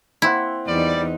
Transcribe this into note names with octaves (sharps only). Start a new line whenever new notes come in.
A#3 C4 E4 F#5
E2 G3 D#4 D5